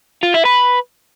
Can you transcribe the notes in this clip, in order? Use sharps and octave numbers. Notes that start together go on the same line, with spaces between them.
F4
E4
B4